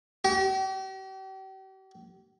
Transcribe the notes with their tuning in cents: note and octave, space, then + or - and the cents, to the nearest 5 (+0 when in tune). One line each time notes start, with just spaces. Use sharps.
G4 -40